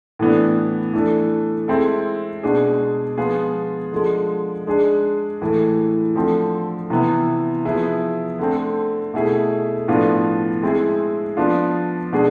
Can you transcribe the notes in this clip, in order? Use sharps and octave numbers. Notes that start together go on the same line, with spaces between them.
A2 E3 B3 D4
E3 A3 D4 A4
G#3 C4 E4 A4
B2 G#3 D4 G#4
F3 G#3 B3 F4 G#4
D3 F3 G#3
G#3 D4 G#4
A2 E3 A3
D3 F3 A3 C4
C3 E3 B3 E4
F3 B3 E4 G#4
D3 A3 C4
B2 A3 E4 G#4
A2 F3 B3 D4 F4
G#3 C4 E4 G#4
F3 B3 D4 F4
B2 G#3 D4 G#4